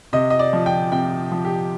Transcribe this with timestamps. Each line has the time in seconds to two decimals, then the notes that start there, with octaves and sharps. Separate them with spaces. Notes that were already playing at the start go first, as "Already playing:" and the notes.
0.13 C3 D#5
0.30 D#5
0.39 D5
0.53 F3
0.66 G5
0.92 C3 G5
1.32 F3
1.45 G4